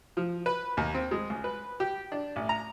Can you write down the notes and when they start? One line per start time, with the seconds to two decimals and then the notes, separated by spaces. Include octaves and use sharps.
0.17 F3
0.46 B4
0.77 D#2
0.94 C4
1.11 G#3
1.30 C#2
1.44 B4
1.80 G4
2.12 D4
2.36 A1
2.49 A#5